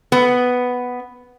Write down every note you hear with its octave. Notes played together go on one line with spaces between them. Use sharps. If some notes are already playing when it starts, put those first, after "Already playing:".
B3